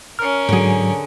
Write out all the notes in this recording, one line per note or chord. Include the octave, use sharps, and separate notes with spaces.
C#4 A#4 F6
G#2 D3 F#3 G#4